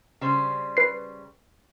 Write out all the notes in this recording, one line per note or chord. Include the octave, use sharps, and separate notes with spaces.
C#3 G3 C5
B4 C7